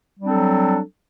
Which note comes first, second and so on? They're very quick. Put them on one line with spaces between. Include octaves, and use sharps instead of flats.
G3 D4 C4 A4 F#3